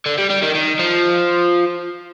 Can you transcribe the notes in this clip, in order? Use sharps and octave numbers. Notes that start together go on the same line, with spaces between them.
D3
G3
G3
D#3
D#3
F3